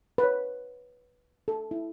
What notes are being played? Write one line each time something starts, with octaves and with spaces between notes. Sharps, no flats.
B4
C#5
A4
E4